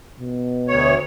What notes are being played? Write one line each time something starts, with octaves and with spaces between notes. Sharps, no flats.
B2
D2 C#5